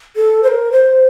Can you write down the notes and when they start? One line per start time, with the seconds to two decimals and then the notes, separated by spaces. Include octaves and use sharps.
0.16 A4
0.43 C5
0.48 A#4
0.72 C5